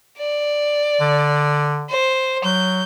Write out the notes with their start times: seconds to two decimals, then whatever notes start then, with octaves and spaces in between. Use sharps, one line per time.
0.18 D5
1.00 D3
1.90 C5
2.45 F#3 G6